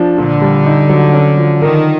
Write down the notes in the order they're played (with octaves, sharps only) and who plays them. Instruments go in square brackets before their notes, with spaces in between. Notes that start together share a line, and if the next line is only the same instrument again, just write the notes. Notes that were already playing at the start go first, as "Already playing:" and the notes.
Already playing: [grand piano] F3 D4
[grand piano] A#2 [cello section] D3
[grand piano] G3
D#4
F#3
C#4
F3
[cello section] D#3 [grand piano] A#4